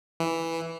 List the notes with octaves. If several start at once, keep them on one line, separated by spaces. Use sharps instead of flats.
E3